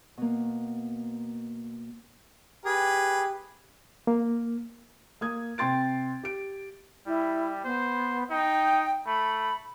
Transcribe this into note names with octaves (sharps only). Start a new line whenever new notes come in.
B2 A#3
G4 G#4 B4
A#3
A#3 D#6 G#6
C3 G5 C6 A6 D7
G4 D7
G3 E4
B3 C5
D#4 G5
A3 B5